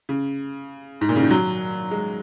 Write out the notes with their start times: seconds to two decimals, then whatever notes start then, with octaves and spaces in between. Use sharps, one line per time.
0.09 C#3
1.01 G#2
1.09 A#2
1.16 C#3
1.23 D#3
1.31 F#3
1.91 G#3